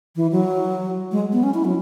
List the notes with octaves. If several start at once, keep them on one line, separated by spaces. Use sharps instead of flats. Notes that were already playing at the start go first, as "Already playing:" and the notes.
E3
F#3
G#3
B3
C#4
E4
F#3